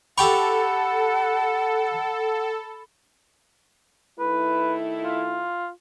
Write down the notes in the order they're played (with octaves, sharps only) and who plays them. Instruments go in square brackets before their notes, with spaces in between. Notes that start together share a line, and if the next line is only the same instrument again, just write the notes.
[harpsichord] G4 G5 C#6 [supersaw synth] A4 [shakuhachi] F#5 [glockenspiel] B5
[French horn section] D#3 A3 E4 [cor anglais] B4
[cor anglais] F4